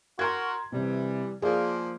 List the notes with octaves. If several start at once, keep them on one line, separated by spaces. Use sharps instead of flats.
F#4 A#4 A#5 C6 G#6
C3 E3 G3
F3 A#3 G#4 D5